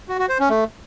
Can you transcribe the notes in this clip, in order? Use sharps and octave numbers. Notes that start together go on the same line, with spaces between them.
F#4
F#4
C5
C#4
A3